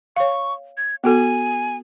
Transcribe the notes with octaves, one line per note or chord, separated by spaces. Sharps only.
C#5 F5 C#6
G#6
B3 F#4 A4 G#5